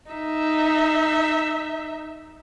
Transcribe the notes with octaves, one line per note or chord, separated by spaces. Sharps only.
D#4 E5